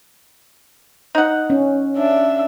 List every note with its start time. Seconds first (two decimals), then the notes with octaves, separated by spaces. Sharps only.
1.15 D#4 F#5
1.50 C#4
1.97 D4 E5